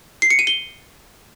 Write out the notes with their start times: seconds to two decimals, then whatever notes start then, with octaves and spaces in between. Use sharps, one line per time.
0.22 C7
0.30 C#7
0.39 D#7
0.47 G7